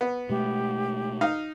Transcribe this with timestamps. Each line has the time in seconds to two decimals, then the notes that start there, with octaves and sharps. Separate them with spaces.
0.01 B3
0.29 B2 G#3 A3 G4
1.21 D#4 F5